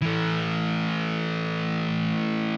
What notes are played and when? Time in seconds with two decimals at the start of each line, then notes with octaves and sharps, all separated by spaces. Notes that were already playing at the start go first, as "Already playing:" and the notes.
0.01 E3 A3